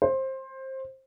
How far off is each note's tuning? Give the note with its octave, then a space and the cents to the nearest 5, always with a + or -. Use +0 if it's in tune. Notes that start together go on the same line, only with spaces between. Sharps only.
C5 +20